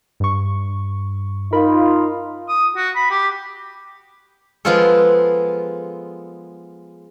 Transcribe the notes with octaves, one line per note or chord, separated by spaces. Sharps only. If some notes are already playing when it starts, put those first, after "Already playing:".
G2 C#6
D#4 F4 A#4 B5
D#6
F#4
B5
G4
F3 G#3 B3 F4 G#4 A4